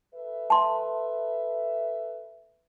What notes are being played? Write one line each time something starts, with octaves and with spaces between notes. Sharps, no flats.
A4 B4 E5
A5 C6